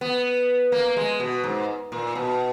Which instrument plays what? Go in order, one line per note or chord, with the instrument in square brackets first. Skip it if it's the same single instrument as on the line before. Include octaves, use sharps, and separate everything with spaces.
[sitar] B3
A#3
G#3
B2
G#2
A#2
B2